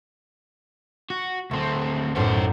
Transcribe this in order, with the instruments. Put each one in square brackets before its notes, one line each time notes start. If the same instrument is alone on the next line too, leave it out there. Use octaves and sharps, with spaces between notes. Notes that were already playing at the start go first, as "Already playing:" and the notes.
[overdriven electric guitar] F#4
[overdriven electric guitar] D2 C4 [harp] A3 C6
[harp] B1 F#2 A2 [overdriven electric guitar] B3 C5